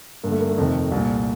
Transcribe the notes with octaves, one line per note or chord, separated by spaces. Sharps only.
G2 D3 A#3
A3
A#3
A3
F2 C3 D#3
C2
A#2